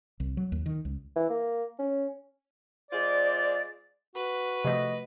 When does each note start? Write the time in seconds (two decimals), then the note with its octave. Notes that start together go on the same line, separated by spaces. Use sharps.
0.20 C2
0.37 F#3
0.52 D#2
0.66 D#3
0.85 C#2
1.16 E3
1.30 A#3
1.79 C#4
2.91 G#3 F4 C5 D5
4.15 F#4 B4
4.65 C3 F3 A3 D#5